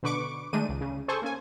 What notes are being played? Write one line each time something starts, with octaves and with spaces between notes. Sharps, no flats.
B2 D3 B4 C#6 D6 D7
D#3 G#3 A3 D4 D#4 D#7
C#2
C#3
G#4 A4 C5 G#5 C#6
A#3 C#4 G#5